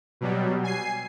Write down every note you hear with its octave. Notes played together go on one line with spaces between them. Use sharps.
B2 F#3 G3
G#5 C7